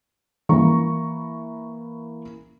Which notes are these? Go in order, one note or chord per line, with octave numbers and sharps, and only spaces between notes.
E3 A#3 A#4 A#5 C#6